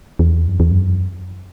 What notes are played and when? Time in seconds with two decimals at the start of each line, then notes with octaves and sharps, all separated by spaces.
0.19 E2
0.47 F#2
0.60 E2
0.71 F#2